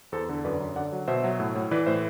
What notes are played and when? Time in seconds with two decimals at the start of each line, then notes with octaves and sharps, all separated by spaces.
0.12 E2 A4 C5
0.29 D3
0.44 F#2 B4 D5
0.60 F#2
0.76 D3 D5 F#5
0.92 F#3
1.08 B2 C5 E5
1.24 F#3
1.40 A2
1.55 A2
1.71 E3 B4 D5
1.87 A2 C5 E5